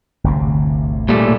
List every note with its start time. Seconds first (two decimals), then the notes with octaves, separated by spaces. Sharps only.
0.24 G1 D2 C3
1.09 A#2 G3 A3